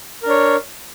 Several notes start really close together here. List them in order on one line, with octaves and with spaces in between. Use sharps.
A#4 D4 C#5